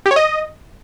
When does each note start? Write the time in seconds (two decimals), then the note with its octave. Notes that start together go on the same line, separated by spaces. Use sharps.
0.06 G4
0.11 C#5
0.16 D#5